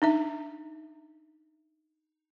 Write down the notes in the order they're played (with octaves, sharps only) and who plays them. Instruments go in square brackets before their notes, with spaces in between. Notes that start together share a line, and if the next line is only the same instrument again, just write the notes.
[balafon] D4 D#4 E5